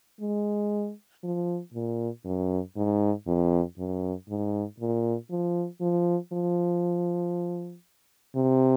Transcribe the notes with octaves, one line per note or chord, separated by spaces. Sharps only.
G#3
F3
A#2
F#2
G#2
F2
F#2
G#2
A#2
F3
F3
F3
C3